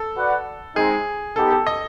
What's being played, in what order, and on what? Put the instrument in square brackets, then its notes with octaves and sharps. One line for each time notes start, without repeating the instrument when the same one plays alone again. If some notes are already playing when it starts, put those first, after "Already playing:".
Already playing: [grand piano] A4
[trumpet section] F#4 B4 D5 F#5
[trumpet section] G#3 C4 D#4 [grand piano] G#4
[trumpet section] B3 D#4 G4 [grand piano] A4
[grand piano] A4
D#5